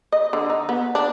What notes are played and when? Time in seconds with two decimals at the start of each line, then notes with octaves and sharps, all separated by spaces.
0.12 D#5
0.33 D3
0.50 D#4
0.69 B3
0.95 D4